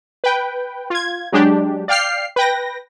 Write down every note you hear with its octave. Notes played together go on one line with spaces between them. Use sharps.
B4 G5
F4 G#6
F#3 G#3 D4 G4
D5 F5 G5 F6 C7
B4 G5 A#6